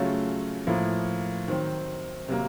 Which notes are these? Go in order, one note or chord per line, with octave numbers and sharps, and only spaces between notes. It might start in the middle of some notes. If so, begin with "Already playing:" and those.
Already playing: C#3 F#3 A3 C#4 F4
A2 F3 A#3
D#3 F#3 C4
C3 F#3 A#3